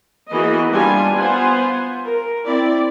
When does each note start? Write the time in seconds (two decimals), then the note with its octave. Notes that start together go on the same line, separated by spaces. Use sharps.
0.31 E3 A#3 B3 F#4 G#4 D#5
0.72 G3 D4 F4 G#5
1.17 B3 F4 C5 F#5 G#5
2.06 A#4
2.46 C4 E4 D5